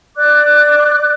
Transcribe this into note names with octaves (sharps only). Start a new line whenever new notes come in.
D5 D6 F#6